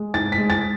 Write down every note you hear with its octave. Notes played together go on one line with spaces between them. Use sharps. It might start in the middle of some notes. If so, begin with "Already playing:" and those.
Already playing: G#3
G#2 A6
B6
G#3
A6